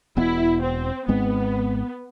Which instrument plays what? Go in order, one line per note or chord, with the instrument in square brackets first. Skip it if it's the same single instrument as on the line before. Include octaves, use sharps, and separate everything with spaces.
[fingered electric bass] E1 E2 B2 B3 [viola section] E4
[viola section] C4
[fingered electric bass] G#1 G#2 G#3 C4 [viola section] B3